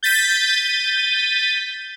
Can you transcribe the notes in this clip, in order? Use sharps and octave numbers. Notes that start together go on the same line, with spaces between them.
G6 A6 B6 D#7